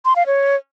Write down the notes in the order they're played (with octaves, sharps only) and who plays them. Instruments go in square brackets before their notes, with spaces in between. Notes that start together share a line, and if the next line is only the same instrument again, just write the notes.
[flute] C6
F5
C#5